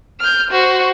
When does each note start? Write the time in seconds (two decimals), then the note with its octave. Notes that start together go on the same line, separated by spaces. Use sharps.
0.20 F6 G6
0.51 F#4 C5